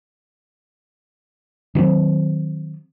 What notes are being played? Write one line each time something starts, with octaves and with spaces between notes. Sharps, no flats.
D#3 F#3 G3 C4